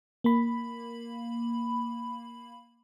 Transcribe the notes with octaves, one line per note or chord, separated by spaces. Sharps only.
A#3 B5